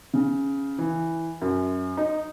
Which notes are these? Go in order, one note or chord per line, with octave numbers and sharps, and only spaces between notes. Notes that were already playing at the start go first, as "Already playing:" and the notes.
C#3
E3
F#2
D#4